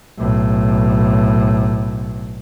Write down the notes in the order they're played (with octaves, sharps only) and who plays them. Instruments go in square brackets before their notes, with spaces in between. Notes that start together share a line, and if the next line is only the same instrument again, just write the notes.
[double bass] B1 A2